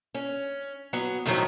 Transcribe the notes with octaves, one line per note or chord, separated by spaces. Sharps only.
C#4
F#3 B3
F2 A2 D#3 E3 F#3 A3